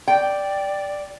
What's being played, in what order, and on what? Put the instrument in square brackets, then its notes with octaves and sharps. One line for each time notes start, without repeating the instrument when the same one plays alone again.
[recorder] D5 [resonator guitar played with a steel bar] G5